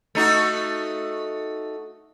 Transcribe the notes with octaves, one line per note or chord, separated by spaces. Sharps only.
A3 D#4 F#4